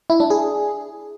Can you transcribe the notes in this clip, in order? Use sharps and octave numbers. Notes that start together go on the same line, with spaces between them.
E4
D4
G#4